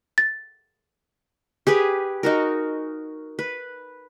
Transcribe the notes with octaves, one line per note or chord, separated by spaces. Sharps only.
A6
G4 G#4 B4
D#4 F#4 A#4
B4